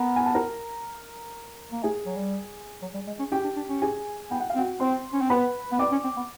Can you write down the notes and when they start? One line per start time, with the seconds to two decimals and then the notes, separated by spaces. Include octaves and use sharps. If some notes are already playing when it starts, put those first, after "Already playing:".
Already playing: B3 A#4
0.16 G#5
0.26 A5
0.34 A#4 A#5
1.72 A#3
1.83 A3 G#4 G#5
2.06 F#3
2.16 G3
2.82 F#3
2.94 G3
3.07 G#3
3.19 C#4
3.32 C#4 G4 G5
3.44 D4
3.57 D4
3.69 C#4
3.82 G#4 G#5
4.31 B3 G5
4.40 F#5
4.50 F5
4.55 C4
4.58 F#4 F#5
4.80 C4 C5 C6
5.14 C#4
5.21 C4
5.30 B3 B4 B5
5.72 B3
5.79 C4 D5 D6
5.92 C#4
6.04 C4
6.17 B3